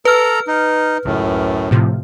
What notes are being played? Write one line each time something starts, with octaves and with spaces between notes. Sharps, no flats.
A4 B4 A#5 F6
D#4
C#2 F#2 A2
A2 C3 F3